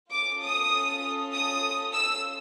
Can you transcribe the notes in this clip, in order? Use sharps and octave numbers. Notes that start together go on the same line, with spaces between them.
C#4 F4 A4 D6
D#6
D#6
E6